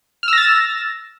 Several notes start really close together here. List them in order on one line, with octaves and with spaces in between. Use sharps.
F6 E6 A#6 A6 E7